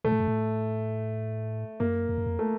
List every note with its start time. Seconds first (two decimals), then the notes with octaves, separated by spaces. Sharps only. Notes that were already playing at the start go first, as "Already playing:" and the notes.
0.04 A#2 A3
0.12 A2
0.20 F#2
0.27 A2
1.80 F#2 A#3
2.09 F2
2.18 F#2
2.26 F2
2.39 A3